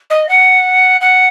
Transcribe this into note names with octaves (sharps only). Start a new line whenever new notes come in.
D#5
F#5
F#5